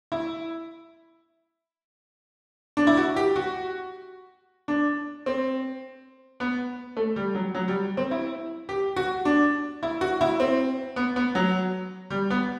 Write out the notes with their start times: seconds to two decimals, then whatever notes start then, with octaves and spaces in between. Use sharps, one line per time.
0.12 E4
2.77 D4
2.87 E4
2.97 F#4
3.16 G4
3.36 F#4
4.68 D4
5.26 C4
6.40 B3
6.97 A3
7.16 G3
7.35 F#3
7.55 F#3
7.68 G3
7.97 C4
8.11 E4
8.69 G4
8.96 F#4
9.25 D4
9.83 E4
10.01 F#4
10.21 E4
10.40 C4
10.96 B3
11.16 B3
11.35 F#3
12.10 G3
12.30 B3